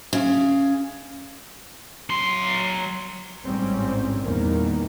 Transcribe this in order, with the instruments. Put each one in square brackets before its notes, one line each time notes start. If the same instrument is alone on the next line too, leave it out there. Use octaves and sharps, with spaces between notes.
[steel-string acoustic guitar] C#3
[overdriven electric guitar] F#3 C6
[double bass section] A1 G#2 G3 C4 C#4
E2 A#2 D#3 G3 A#3